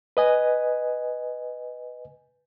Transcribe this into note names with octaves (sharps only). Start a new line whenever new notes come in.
B4 D#5 G#5